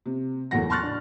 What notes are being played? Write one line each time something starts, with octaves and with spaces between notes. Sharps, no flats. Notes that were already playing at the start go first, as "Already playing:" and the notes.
C3
F#1 E2 A2 F#3 F#5 A#6
A5 C6 C#6 F6 F#6 A6
D4